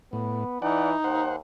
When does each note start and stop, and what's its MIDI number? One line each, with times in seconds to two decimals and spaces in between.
0.13 0.44 45
0.13 0.58 59
0.62 0.94 52
0.62 1.35 63
0.62 0.91 74
0.62 0.91 78
1.04 1.37 39
1.04 1.36 72
1.04 1.36 78